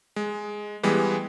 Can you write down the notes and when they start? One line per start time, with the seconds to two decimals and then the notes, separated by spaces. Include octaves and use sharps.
0.16 G#3
0.83 E3 G3 G#3 B3